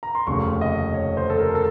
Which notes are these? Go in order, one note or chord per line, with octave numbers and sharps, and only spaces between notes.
A#5
C6
F1 D#2 C#3 C#6
D#5
C#5
C5
A4
A#4
A4